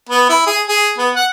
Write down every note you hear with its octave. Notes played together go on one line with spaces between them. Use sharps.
B3
E4
G#4
G#4
B3
F#5